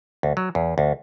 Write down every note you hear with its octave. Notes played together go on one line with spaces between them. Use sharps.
D2
F#3
E2
D2